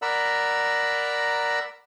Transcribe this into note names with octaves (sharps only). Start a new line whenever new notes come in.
A#4 D5 F#5 A#5 B5 E6